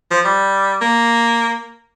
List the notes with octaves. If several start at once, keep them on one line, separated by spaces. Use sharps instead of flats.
F3
G3
A#3